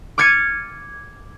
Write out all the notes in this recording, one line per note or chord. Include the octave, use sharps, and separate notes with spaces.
D6 F6 G#6 A6 C#7 D#7